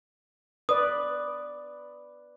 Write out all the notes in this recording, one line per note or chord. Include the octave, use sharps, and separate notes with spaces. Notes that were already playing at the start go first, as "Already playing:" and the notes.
B4 D5 D#6